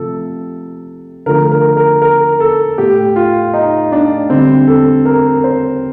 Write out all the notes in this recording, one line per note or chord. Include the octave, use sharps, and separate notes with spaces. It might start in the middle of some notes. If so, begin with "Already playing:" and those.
Already playing: C3 F3 A3 A4
D3 F3 A3 A#4
A#4
A#4
A#4
A4
A2 A3 G4
F4
D#4
D4
D3 G3 C4
A4
A#4
C5